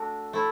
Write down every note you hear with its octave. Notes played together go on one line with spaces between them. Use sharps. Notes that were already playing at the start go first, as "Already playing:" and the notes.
Already playing: A3 D4 F#4
A3 E4